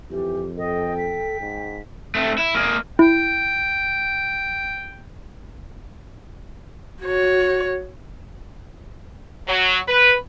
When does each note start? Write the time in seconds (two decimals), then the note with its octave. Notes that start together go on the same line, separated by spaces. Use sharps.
0.11 F2 E3 G4
0.58 A4 D#5 G5
0.98 B6
1.40 G#2
2.15 A3 C4
2.38 E4
2.55 A#3 G#4
2.99 E4 G5
7.03 F#4 C#5
9.48 F#3
9.88 B4